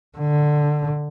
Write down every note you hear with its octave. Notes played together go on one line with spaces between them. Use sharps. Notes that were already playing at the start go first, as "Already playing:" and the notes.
D3